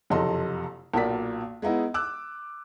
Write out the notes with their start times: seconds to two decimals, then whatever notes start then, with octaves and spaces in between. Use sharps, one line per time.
0.10 F#1 F2 C3 A4 D#5 C6
0.94 B1 A#2 A#4 D5 B6
1.62 G#3 B3 D#4 E4
1.94 D6 E6 F#6